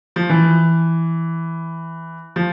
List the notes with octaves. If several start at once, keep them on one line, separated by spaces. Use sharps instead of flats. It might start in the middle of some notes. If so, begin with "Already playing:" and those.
F3
E3
F3